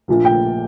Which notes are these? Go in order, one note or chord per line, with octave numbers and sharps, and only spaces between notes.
A#1 A#2 F3 A#3
G5